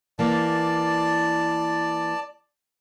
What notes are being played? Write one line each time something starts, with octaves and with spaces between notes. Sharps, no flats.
E3 A#3 D5 A5